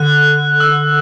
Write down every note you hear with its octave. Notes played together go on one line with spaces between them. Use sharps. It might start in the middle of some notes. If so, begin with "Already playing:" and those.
Already playing: D3 F#6
E6